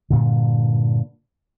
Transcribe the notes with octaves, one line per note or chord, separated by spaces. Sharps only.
G2 A#2 D3